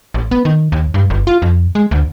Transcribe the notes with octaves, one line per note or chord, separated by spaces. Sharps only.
A1
B3
D#3
D#2
G2
G1
F4
F2
G#3
D2